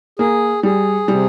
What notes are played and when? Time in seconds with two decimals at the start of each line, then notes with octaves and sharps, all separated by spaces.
0.19 A#3 G#4
0.63 G3 G#4
1.08 C3 G3